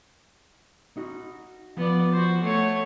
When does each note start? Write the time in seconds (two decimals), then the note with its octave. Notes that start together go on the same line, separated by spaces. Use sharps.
0.97 D#4 F#4
1.77 F3 B3 D5
2.12 F#4 C5
2.42 A3 C#5 F#5